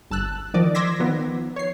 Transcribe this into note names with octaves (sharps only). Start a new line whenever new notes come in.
G1 A5 E6 F#6
D#3 F3 D5 D#5
C6 D6 E6 G#6 A#6 B6
D#3 F3 B3
C#5 C7